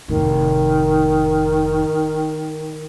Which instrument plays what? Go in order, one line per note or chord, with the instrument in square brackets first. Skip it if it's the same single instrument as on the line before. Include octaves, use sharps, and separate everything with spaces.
[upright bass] F1 A2 [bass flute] D#3